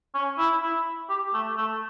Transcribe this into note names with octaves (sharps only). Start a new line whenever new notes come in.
C#4
E4
E4
G4
A3
A3